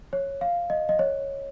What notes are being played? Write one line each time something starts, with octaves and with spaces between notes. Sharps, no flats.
C#5
F5
D#5
D#5
C#5